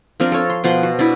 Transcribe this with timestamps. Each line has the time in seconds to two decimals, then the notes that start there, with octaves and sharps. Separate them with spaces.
0.20 F3 C4 D4 A#4
0.32 A4 A#4 C#5
0.50 C6
0.64 B2 F3 F#5 C6
0.83 F#4
0.99 D4 E4